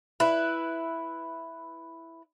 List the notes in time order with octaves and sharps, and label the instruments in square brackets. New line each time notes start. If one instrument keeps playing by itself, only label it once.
[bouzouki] E4 B4